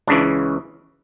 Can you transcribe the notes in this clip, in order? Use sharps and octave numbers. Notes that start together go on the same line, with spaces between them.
C#2 C#3 E3 D4